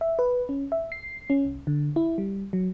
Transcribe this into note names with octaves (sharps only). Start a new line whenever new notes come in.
E5
B4
C#4
E5
C7
C#4
C2
D3
E4
G3
F#3